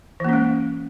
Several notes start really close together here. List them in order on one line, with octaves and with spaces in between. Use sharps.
E3 A#3 C#4 G#3